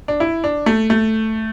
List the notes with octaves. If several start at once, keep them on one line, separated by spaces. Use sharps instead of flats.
D4
E4
D4
A3
A3